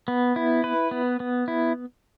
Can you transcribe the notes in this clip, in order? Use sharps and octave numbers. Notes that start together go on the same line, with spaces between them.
B3
E4
B4
B3
B3
E4